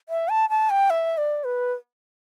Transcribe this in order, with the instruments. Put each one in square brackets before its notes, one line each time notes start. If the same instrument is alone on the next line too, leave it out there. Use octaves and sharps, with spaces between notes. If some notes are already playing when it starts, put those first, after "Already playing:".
[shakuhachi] E5
A5
A5
G5
E5
D5
B4